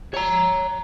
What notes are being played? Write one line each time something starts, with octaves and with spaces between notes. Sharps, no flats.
C#5 A#5